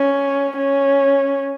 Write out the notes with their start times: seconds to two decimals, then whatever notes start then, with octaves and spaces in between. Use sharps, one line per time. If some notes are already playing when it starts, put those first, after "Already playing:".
Already playing: C#4
0.57 C#4